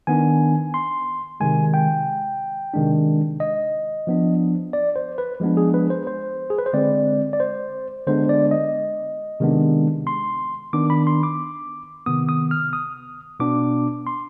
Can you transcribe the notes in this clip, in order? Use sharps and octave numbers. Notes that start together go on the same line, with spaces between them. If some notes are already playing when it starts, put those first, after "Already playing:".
D#3 B3 D4 G#5
C6
C3 D#3 G#3 G#5
G5
C3 D#3 G#3 D4
D#5
F3 B3 D4
D5
C5
B4
F3 G#3 B3 D4
G#4
B4
C5
C5
G#4
B4
C5
D3 G#3 C4 D5
D5
C5
D3 G#3 B3 D4 C5
D5
D#5
C3 D#3 G#3 B3 D4
C6
D#3 B3 D4 D6
B5
C6
D6
C3 D#3 B3 D#6
D#6
F6
D#6
B2 B3 D4 D6
C6